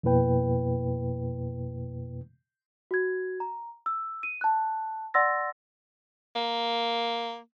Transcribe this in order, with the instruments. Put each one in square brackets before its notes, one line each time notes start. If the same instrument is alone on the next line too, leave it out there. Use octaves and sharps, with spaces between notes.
[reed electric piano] F2 B2 A#3 E4 B4 G5
[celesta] F#4 G#6
A#5
E6
D#7
A5 F#6
D5 F#5 C6 E6 A6 A#6
[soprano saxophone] A#3